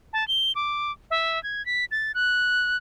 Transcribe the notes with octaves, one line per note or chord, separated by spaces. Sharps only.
A5
G7
D6
E5
G#6
B6
A6
F#6